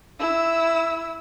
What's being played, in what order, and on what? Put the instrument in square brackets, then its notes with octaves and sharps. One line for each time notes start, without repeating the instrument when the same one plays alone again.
[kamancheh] E4 E6